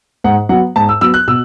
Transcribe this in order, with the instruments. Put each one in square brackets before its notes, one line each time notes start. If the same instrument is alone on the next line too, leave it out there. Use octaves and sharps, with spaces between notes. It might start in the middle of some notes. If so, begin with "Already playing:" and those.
[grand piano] G#2 F#5
F#3 B3 F#5
G#2 A5
E6
F#3 B3 E6
F#6
B2 E6